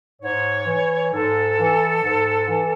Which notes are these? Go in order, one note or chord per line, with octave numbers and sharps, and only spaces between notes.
G#2 C#5
E3
G#2 A4
E3
G#2
E3